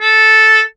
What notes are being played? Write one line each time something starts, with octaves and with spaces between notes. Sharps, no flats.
A4